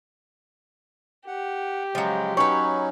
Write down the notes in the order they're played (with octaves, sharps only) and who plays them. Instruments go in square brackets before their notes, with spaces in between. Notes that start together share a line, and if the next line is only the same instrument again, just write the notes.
[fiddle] G4 [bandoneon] F#5
[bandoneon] C#3 G#3 [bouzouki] F3 F#3
[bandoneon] F#3 C#4 D#4 [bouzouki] B4 C#5 [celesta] C#6